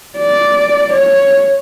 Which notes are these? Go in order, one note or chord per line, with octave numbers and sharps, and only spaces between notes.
D5
C#5